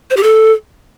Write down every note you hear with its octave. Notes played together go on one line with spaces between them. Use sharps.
C5
G4
A4